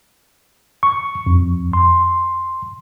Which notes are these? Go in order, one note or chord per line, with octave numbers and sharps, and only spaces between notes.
C#6
F2
C6